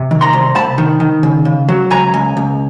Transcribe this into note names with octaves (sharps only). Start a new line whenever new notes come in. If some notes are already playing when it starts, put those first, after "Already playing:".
Already playing: C3
D#3
A#5 C6
C2
C2 A5 B5
D#3
D#3
C#3
C#3
F#3
C#2 G#5 A#5
C#2
C#2